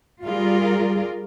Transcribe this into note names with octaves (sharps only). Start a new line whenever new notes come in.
G3 F4 G#4 A#4 D5